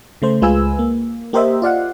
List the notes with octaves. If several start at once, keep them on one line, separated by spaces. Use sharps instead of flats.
C#3 A3 C5
C#2 G#3 F4 B4 G#5 E6
A#3
A#3 G4 A#4 C5 D#5 E5
F4 D5 F5 F#5